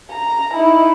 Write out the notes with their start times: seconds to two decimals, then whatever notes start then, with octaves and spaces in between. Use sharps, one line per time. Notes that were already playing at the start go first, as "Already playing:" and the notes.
0.12 A#5
0.54 D#4 E4